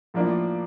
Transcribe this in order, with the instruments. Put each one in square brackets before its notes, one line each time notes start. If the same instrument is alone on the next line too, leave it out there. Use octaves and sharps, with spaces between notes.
[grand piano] A2 F3 A#3 D4